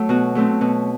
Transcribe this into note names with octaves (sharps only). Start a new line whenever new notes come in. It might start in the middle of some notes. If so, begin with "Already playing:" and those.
Already playing: F#3 A3
B2 F#4
F#3 A3 C4
B2